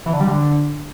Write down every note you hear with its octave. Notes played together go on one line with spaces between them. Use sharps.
E3
D3
G3
D3